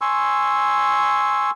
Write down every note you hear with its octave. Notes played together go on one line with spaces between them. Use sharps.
G#5 C6 C#6 E6